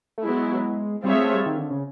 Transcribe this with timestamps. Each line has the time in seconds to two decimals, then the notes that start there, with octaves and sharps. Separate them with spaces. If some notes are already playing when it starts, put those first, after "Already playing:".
0.18 A3
0.24 F#3 G#3 B3 E4
1.04 G3 C4 F4 G#4 C#5 E5
1.14 A3
1.24 A3
1.34 G3
1.46 D#3
1.58 D3
1.71 C#3